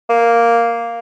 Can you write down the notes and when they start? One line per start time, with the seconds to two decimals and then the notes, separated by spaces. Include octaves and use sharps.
0.10 A#3